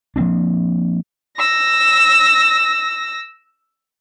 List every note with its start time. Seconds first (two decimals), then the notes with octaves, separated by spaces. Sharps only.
0.16 F3 A#3 C4 D4
1.38 E6 A#6